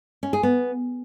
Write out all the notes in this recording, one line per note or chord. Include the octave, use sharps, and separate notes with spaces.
C#4
G#4
B3